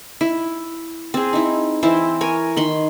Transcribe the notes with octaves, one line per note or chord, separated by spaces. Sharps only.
E4
C4 G#4
D#4 E4
E3 C4 E4 C5
A#4 C#5 G#5
D#3 B5 C6